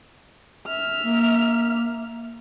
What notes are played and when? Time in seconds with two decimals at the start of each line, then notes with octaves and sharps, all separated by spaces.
0.67 E5 F6
1.02 A#3